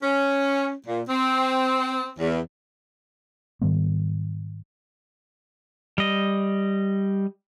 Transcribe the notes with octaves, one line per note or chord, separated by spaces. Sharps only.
C#4
A#2
C4
E2
G#2 D#3 G3 B3
G3 D#5